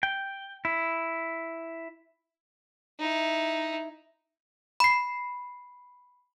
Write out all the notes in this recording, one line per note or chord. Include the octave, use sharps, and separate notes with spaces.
G5
E4
D#4 E4
B5 C7